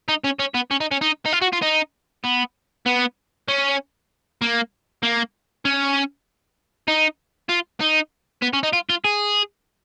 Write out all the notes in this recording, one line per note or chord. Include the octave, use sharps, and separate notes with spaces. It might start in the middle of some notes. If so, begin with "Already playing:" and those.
D#4
C#4
C#4
B3
C#4
D#4
C#4
D#4
D#4
F4
F#4
F4
D#4
B3
B3
C#4
A#3
A#3
C#4
D#4
F4
D#4
B3
C#4
D#4
F4
F4
G#4